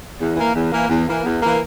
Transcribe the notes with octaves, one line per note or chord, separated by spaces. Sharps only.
E2
E3 A#3
E2
E3 A#3
E2
E3 A#3
E2
E3 A#3